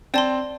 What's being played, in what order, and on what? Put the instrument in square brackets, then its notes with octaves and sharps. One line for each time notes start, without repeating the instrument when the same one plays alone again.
[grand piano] C4 [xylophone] D5 A5 C6